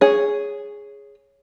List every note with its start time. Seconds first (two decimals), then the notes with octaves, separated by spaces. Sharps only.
0.01 G#4 C#5